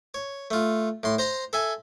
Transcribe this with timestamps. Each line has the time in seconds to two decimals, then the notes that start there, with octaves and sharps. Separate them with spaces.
0.14 C#5
0.51 A3 F4
1.03 A2 C6
1.18 C5 A#5 C6
1.53 A4 E5 G#5